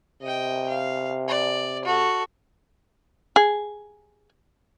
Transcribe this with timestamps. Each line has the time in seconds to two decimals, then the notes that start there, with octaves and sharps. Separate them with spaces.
0.22 C3 D#5 G5
0.69 F5
1.28 D5
1.85 F#4 A4
3.36 G#4